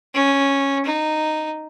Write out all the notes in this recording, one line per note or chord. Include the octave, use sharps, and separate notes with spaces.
C#4
D#4